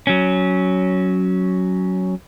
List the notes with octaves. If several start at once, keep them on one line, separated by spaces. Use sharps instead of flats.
F#3 C#4